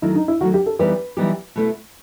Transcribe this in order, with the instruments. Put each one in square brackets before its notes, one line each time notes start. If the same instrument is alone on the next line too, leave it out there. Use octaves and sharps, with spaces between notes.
[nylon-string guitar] D#3 F#3 A3 [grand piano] E4
[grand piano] D#4
E4
[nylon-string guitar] D#3 F#3 A3 [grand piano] F#4
[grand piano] G4
A4
[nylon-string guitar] E3 G3 B3 D#4 G4 [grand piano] B4
[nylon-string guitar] E3 G3 B3 D#4 G4
B2 A3 E4